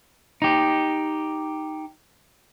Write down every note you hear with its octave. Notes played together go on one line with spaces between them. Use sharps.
D#4 G4